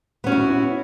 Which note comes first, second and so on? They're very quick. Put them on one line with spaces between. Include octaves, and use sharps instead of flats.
B3 C#4 F#4 E4